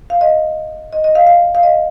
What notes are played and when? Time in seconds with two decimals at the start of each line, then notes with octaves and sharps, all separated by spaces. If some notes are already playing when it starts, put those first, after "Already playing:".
0.10 F5
0.21 D#5
0.93 D#5
1.04 D#5
1.15 F5
1.27 F5
1.55 F5
1.63 D#5